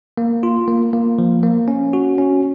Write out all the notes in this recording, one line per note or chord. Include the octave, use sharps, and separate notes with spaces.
A#3
F4
A#3
A#3
F3
A#3
C#4
F#4
C#4